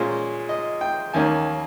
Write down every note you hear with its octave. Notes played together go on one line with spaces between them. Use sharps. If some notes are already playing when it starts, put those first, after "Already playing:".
Already playing: A#2 G#3 C#4 C5
D#5
G5
D#2 D#3 A#3 C#4 G#5